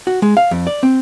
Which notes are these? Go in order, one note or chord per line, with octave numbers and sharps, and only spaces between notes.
F#4
G#3
F5
F2
D5
C4